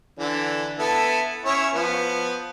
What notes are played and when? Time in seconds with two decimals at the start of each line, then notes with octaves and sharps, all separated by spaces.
0.20 D3 E3
0.79 B3 E4 A4
1.45 C#4 E4 C#5
1.74 F3 B3